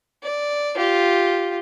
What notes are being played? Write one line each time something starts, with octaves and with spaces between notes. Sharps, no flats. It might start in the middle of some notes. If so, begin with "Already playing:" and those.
D5
F4 G4